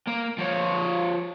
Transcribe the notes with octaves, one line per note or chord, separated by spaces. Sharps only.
A#3
F3 C#5